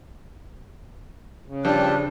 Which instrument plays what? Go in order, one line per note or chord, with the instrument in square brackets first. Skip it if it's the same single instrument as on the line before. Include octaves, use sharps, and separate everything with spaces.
[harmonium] C#3
[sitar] G2 [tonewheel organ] F3 G4 [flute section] D5 A5 F#6